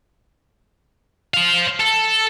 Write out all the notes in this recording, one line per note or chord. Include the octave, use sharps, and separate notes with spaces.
C5 F5
A4